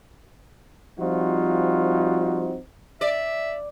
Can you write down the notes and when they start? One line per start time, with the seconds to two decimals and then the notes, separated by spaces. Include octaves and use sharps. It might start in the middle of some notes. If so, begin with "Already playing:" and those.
0.98 F3 G3 C4 D#4 F4 F#4
3.01 D5 E5